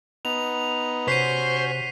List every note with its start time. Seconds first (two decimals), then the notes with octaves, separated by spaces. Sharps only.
0.25 B3 D#4 F7
1.08 C3 C#4 F#4 C5 B6 C7 D#7